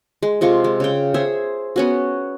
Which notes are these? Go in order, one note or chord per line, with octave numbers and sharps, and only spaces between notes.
G#3
C3 G#3 F4 C#6
G#3
C#3 G5
G#4 C5 C#5 E5
B3 C#4 F#4